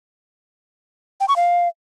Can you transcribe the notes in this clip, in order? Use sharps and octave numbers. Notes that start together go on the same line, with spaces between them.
G5
C#6
F5